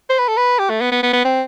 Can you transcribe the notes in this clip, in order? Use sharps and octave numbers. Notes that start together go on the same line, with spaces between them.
C5
B4
A4
B4
G4
A3
B3
B3
B3
B3
C4